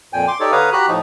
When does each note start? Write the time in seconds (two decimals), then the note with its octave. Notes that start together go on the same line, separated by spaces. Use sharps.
0.13 F2 A#2 G5 G#5
0.28 C6 D6
0.40 D#4 G4 A4 C#5 D5
0.52 D3 B4 C#5 F5 A#5 D#6
0.73 F#4 G4 A#5 B5 F#6
0.88 A2 F3 D#4